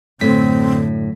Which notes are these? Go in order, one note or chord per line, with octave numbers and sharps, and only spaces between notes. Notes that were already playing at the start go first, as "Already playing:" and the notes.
F#2 A2 D3 A3 C4 B6